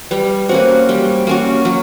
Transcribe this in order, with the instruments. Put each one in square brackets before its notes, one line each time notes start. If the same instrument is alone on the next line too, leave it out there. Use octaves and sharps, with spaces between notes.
[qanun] G3 [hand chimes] B4
[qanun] A#3 C#4 F#4 [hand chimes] C5
[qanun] G3
A#3 C#4 F#4
[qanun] F#3 [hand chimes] C#5